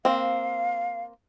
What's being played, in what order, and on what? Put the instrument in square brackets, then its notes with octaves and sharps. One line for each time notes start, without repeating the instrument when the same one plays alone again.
[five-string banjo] A#3 C4 [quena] F5